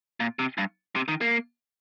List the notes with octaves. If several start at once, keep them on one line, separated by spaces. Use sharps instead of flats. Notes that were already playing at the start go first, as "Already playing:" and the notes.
A#2
C3
G2
C3
D#3
A#3